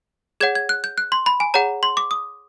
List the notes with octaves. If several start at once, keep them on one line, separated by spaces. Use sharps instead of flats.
G#4 C#5 F#5 G#6
G#6
F#6
G6
F#6
C6
B5
G#5
G#4 C#5 F#5 A#5
C6
D6
D#6